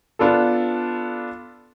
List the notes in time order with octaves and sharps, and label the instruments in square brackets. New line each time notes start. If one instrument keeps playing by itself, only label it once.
[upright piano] B3 D4 F4 A4